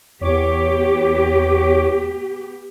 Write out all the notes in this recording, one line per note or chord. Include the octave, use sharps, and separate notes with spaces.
E2 B3 G4 C#5 D6